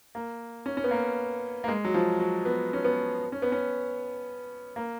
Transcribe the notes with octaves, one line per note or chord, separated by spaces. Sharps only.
A#3
C#4
C#4
B3
A#3
A#3
G#3
F#3
F3
F#3
B3
C#4
B3
C#4
B3
C#4
A#3